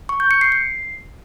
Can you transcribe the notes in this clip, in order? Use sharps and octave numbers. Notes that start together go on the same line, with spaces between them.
C#6
G6
C#7
C7
C7